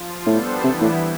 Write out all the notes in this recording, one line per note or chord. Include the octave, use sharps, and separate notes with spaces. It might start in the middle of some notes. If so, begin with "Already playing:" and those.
Already playing: F3 F4
A2 G3 B3 D4 A4 C5
C3 E3 G3 B3 E4
A2